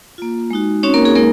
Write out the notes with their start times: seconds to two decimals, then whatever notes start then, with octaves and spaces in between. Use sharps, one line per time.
0.18 A#3 F4
0.51 G#3 D#4 F#4
0.83 C4 C#4 D#4 F#4 C#5
0.94 A#3 A#4
1.05 G#4
1.15 G#3 A#3 D#4 A#4